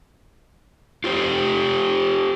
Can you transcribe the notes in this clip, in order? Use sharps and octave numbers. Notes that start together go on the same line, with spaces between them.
F4 G4 C5